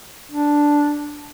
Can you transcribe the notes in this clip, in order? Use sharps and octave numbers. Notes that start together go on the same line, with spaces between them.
D4